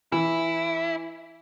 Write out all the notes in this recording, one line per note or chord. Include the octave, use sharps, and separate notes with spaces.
E3 E4